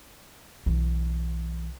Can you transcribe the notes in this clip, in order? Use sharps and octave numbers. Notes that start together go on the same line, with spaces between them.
B1 E3